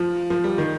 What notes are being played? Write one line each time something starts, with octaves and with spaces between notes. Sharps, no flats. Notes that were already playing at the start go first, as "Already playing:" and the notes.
Already playing: F3
F3
G3
D#3